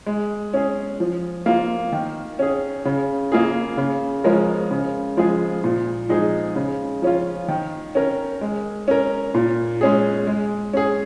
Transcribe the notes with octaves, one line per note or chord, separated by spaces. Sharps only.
G#3
C#4 G#4
F3
A#3 F4
D#3
C#4 G#4
C#3
A#3 F4 G#4
C#3
F3 G#3 C#4 A#4
C#3
F3 G#3 F4 G#4
A#2
F3 G#3 D#4 G#4
C#3
F3 C#4 F4
D#3
C#4 A#4
G#3
C#4 A#4
A#2
G#3 C#4 G#4
G#3
C#4 G#4